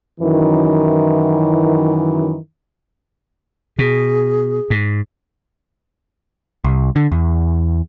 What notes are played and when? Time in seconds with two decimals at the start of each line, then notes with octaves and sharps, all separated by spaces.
0.20 F#2 D#3 E3
3.79 B2 G#4
4.70 G#2
6.64 C2
6.96 D3
7.12 E2